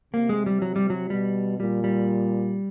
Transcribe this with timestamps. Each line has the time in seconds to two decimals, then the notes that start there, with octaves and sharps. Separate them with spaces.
0.13 C3 A#3
0.29 G#3
0.46 G3
0.62 F#3
0.76 G3
0.90 F#3
1.10 B2 G3
1.59 A#2 G3
1.84 G3